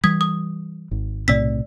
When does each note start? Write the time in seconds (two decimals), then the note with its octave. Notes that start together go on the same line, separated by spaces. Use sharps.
0.04 E3 G3 D#6 G#6 B6
0.21 D#6
0.91 G#1
1.28 B1 A2 C3 D5 E6 B6